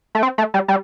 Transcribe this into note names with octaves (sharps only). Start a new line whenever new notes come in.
A3
C4
A3
G3
G3